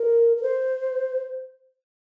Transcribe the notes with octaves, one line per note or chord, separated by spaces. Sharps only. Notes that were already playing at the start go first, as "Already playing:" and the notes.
Already playing: A#4
A#4
C5